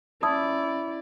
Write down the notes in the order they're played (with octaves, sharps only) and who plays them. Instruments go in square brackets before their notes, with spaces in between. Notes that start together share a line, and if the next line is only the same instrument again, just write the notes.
[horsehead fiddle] C#4 D5 [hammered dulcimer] E4 [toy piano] A5 D#6